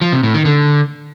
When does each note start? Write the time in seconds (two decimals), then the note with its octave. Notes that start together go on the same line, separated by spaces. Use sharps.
0.01 F3
0.12 C3
0.23 A2
0.34 D#3
0.45 D3